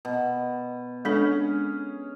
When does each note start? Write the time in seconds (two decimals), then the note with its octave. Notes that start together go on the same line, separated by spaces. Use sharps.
0.05 B2
1.05 G#3 C#4 D4 G#4 A4